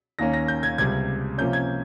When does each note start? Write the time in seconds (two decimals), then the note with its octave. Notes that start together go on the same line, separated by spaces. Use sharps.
0.19 D#2 D#3 A#3 C#4 A#6
0.33 A#6
0.48 G6
0.63 G#6
0.78 C#2 C3 G3 G#6
1.38 C3 F3 A#3 C#4 G6
1.53 G#6